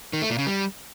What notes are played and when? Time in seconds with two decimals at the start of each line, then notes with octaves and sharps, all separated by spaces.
0.13 D#3
0.22 A3
0.30 A#2
0.38 C#3
0.47 G3